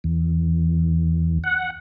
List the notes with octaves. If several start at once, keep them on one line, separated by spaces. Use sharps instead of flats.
E2
F#5